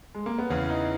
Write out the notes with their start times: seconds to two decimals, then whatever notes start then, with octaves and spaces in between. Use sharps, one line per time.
0.15 G#3
0.26 A#3
0.38 B3
0.50 E2 C#3 E3 C#4
0.70 D#4